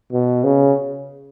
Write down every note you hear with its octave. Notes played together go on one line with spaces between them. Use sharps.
B2
C#3